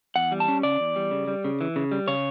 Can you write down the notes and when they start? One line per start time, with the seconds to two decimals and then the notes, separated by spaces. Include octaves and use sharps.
0.16 E2 F#5
0.32 G3
0.40 A5
0.48 C#4
0.63 C#3 D5
0.80 E2
0.96 G3
1.11 C#3
1.28 G3
1.45 C#3
1.61 E3
1.76 C#3
1.92 G3
2.08 C#3 C#5